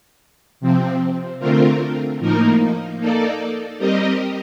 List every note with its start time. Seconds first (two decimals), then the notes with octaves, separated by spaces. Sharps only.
0.60 C3 F3 C4
1.39 D3 A3 C4 F4 A#4
2.19 A2 F3 A#3 D#4 A#4
2.99 A#3 D#4 A4 D5
3.79 G3 C4 G4 A#4 D#5